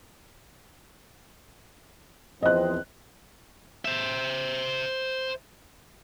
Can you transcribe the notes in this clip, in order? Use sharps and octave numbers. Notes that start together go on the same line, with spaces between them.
E2 F3 C4 D#5 F#6
C5 E5